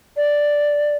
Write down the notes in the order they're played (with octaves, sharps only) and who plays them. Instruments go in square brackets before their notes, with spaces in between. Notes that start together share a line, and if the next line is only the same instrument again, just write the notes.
[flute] D5